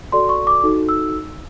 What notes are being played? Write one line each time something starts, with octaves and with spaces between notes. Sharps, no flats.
F#4 A4 D5 C6
C#6
D6
D#4 F#4 A4
E6